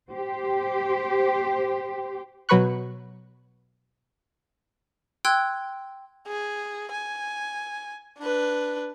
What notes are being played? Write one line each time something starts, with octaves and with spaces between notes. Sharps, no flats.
G4 C5
B2 F#3 B4 B5 C#6 F#6
G5 C6 E6 F#6 G#6
G#4
G#5
D4 B4